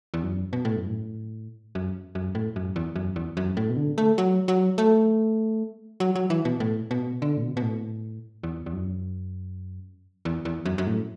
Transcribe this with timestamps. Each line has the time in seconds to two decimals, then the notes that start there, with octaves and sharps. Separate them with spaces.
0.14 E2
0.23 F#2
0.53 B2
0.65 A2
0.76 F#2
0.87 A2
1.75 F#2
2.15 F#2
2.35 A2
2.56 F#2
2.76 E2
2.96 F#2
3.16 E2
3.37 F#2
3.57 A2
3.70 B2
3.77 D3
3.98 A3
4.18 F#3
4.48 F#3
4.78 A3
6.00 F#3
6.15 F#3
6.30 E3
6.45 B2
6.60 A2
6.91 B2
7.22 D3
7.37 A2
7.42 B2
7.57 B2
7.62 A2
8.43 E2
8.66 E2
8.73 F#2
10.25 E2
10.45 E2
10.66 F#2
10.78 F#2
10.87 A2